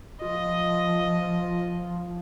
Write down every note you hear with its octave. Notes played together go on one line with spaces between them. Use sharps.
F3 F4 D#5